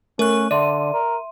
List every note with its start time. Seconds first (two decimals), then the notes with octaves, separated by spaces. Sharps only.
0.19 A3 C#4 A#4 F#6
0.51 D3 D5 E5 C6 D#7
0.94 A#4